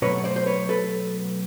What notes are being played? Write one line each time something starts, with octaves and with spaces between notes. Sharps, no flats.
B2 F#3 A3 B4 C#5
C5 D5
C5
B4 C#5
A4 B4